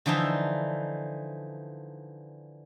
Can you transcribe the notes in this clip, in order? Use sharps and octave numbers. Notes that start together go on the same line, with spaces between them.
D3 E3 F3 D#4 E5